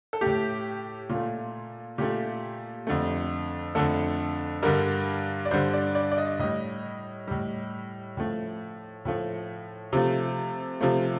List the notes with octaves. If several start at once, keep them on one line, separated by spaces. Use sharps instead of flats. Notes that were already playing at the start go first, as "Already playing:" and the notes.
A4
A2 A3 G4
A#2 F4
A3
A#2 A3 G4
F2 D3 A3
F2 D3 A3 A4
G2 D3 G3 A#4
D5
G2 D3 G3 C5
D5
D5
D5
D#5
A2 G3 D#5
A2 G3
A2 F3 A3
A2 F3 A3
C3 F3 A3
C3 F3 A3